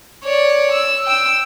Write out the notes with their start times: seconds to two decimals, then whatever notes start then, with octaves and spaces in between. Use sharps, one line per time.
0.24 C#5 D5
0.72 E6
1.06 G5 E6